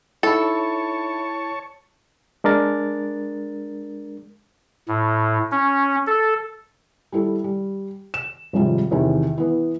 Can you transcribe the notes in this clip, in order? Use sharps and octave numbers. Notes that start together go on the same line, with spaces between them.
D#4 E4 A4 C#5 E5 A5 B5 C#6
G#3 D4 A#4 A6
A2
C#4
A4
G3 E4 A4
G3
E7
G#1 F#2 C3 F3 G3 G#3
E2 C3 D#3
E3 B3